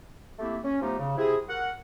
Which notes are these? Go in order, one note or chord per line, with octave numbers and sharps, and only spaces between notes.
A3 A#3 C4 E4 G4
C#4
F3 A3 B3 D#4 G4
C#3
C3 E4 G#4
F#4 A#4 F#5